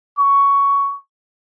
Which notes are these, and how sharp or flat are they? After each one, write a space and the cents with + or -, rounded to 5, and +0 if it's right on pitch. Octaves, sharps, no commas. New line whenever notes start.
C#6 +10